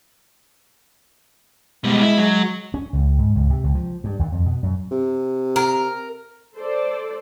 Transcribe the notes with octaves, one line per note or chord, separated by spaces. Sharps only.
B2 G3 G#3
E4
F#3
C#4
C#2
G#2
C#2
C3
C#2
F3
G2
D#2
F2
B2
F#2
C3
A#4
A4 C5 D5